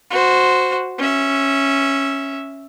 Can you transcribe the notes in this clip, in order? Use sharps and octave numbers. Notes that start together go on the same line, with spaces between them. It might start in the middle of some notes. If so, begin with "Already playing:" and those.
F#4 C5
C#4 E5